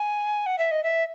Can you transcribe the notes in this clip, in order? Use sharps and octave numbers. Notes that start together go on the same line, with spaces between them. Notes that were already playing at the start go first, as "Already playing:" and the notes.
Already playing: G#5
F#5
E5
D#5
E5